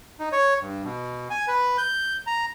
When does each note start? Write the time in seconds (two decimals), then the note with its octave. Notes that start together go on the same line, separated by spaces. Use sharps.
0.20 D#4
0.32 C#5
0.61 G2
0.84 B2
1.30 G#5
1.48 B4
1.78 G6
2.27 A#5